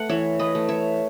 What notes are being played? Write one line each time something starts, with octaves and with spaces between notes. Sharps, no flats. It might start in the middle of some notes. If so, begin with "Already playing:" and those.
Already playing: A3 B4 F#5
E3 C#5 E5
B4 D#5
A3
C#5 E5